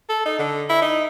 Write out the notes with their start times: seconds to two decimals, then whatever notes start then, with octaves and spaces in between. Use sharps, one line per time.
0.09 A4
0.26 D#4
0.39 D3
0.69 E4
0.82 D#4